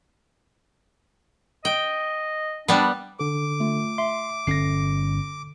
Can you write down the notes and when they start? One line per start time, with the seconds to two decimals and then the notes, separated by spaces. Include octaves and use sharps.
1.65 D#5 G5
2.68 G3 B3 D4
3.19 D3 A4 D6
3.60 A3 F4
3.98 E5 C6
4.47 G1 D3 C#4 A#6 C7